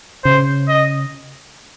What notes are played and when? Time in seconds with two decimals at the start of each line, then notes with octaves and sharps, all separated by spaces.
0.24 C#3 C5
0.68 D#5